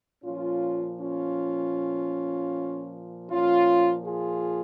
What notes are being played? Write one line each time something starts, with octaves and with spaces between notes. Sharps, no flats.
A#2 F3 C#4 F4
C#4 F4
A#2 F3 C#4 F4
F4 G#4